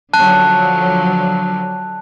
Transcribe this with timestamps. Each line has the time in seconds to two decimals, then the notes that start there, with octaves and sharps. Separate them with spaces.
0.13 D3 F3 F#3 A5 F#6